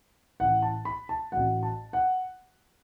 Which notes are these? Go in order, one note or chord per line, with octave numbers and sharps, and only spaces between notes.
A1 A2 E3 F#5
A5
B5
A5
A1 A2 F#3 F#5
A5
F#5